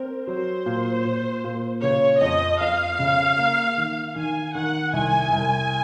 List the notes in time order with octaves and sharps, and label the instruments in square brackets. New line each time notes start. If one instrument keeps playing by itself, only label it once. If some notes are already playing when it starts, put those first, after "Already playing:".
Already playing: [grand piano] C4 [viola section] A#4
[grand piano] F#3 [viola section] C5
[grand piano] A#2
A#2
A#2
[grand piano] C#3 [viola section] C#5
[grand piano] F2 [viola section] D#5
[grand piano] F2 [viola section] F5
[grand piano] C#3
A#3
D#3
[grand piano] D#3 [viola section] G#5
[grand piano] D#3 [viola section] F#5
[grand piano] C2 [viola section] G#5
[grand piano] C2